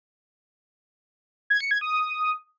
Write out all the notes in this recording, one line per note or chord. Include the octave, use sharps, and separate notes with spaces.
G#6
C#7
G#6
D#6